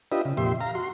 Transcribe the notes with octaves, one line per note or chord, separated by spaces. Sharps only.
D4 F4 G4 B4 D#5 E5
C#3
F2 A#2 G4 E5 C6
F5 A#5
F#4 C6